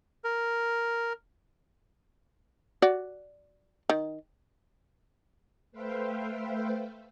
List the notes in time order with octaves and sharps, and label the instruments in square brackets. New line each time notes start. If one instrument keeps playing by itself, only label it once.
[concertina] A#4
[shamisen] F#4 D5
D#3
[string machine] A3 B4 C5 E5 F5 G5